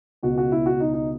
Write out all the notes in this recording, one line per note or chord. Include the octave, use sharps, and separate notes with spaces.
C#2 B2 F#4
F#4
E4
F#4
D#4
D#4